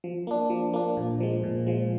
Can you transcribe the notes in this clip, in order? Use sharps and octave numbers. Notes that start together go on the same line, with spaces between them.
F3
A#3 D4
F3
A#3 D4
A#2
F3 G#3
A#2
F3 G#3